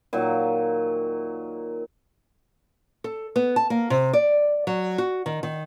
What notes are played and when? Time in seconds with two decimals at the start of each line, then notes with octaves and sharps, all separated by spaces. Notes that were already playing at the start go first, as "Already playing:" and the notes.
0.13 A#2 D#3 F#3
3.04 A4
3.36 B3
3.56 A5
3.70 A#3
3.90 C3
4.13 D5
4.67 F#3
4.98 F#4
5.26 D#3
5.43 D#3